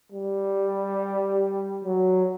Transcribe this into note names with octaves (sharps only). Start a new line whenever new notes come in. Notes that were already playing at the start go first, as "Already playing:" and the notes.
G3
F#3